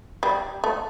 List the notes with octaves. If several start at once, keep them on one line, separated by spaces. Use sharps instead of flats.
G3
A3